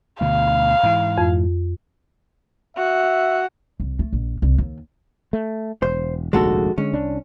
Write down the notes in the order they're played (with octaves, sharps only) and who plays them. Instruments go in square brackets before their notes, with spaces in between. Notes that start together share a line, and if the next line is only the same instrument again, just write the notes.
[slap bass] D2 B2 D3 [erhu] F5
[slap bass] G#2 E3
[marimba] F2
[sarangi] F#4 [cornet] E5
[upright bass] C2
A3
A#1
C2
D#2
[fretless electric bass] A3
[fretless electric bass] E1 [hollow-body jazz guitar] C5
[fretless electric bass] F1 A#1 D#2 [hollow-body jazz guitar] G#3 F#4 A4
[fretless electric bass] D3 G#3 [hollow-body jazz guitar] C#4
[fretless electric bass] C2 D4